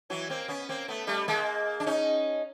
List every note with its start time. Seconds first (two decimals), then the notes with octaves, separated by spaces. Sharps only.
0.10 E3 F#3
0.29 A#3 C4
0.48 B3 C#4
0.69 A#3 C4
0.88 A3 B3
1.07 G3 A3
1.28 G#3 A#3
1.80 D4
1.86 C#4 D#4